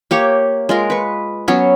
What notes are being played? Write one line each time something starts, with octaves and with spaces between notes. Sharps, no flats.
A#3 G4 C#5
G#3 F4 A#4
B4 C#6
F#3 B3 C#4 F#4